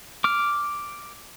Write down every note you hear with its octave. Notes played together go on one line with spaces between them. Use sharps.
D6 F6